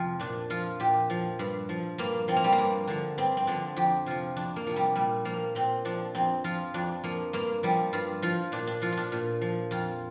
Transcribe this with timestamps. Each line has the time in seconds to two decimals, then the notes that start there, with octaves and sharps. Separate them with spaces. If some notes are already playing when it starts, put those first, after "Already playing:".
Already playing: F2 C3 F3 F4
0.19 A#2 D4
0.50 F3 F4
0.80 A#2 G4
1.10 F3
1.39 G2
1.69 F3
1.98 G2 A#3
2.28 F3 C4
2.36 A#3
2.44 G3
2.52 A#3
2.58 G2
2.88 D3 F3
3.18 G2 C4
3.37 C4
3.47 D3 F3 D4
3.77 F2 G4
4.06 C3 F3 F4
4.36 F2 D4
4.56 A#3
4.67 C3 F3
4.76 G3
4.96 A#2 G3
5.25 F3 A#3
5.55 A#2 C4
5.85 F3 D4
6.15 F2 C4
6.44 F3 F4
6.74 F2 D4
7.04 F3 A#3
7.33 G2 A#3
7.63 F3 G3
7.93 G2 F4
8.22 F3 F4
8.52 A#2 D4
8.67 D4
8.82 F3 F4
8.92 D4 F4
9.12 A#2
9.41 F3
9.71 F2 F4